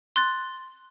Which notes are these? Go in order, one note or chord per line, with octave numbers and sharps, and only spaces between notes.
C6 F#6 A6